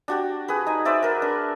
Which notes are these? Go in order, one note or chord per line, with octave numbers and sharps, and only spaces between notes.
D4 F#4 G4
G#4 B4
D#4 G#5 A#5
B4 C5 D5 E5
A#4 B4
D4